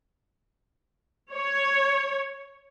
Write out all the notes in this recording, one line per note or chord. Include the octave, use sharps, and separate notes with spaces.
C#5